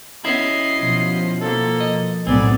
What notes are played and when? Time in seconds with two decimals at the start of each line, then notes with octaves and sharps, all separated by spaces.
0.25 B3 C#4 E4 D#5 C7
0.79 B2 F3
1.41 A#3 A4
1.80 D#5
2.27 B1 A2 B3 C4 D5 G#5